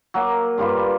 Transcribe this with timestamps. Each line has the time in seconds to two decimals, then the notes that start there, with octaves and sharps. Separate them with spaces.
0.14 F#3 A#3
0.58 G2 G3 F4 B4